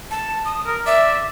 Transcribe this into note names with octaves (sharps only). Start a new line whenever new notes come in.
A5
D#6
A#4
D5 E5